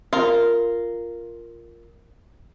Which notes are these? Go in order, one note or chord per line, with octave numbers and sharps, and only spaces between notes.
F4 A#4